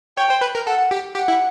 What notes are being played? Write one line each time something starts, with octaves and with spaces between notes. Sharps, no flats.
C#5 G5
C5
B4
A#4
A4 F#5
G4
G4 F#5
E4